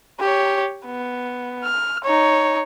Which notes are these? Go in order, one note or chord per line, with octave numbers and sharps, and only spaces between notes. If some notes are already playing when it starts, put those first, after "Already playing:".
G4 C#5
B3
F6
D#4 C#5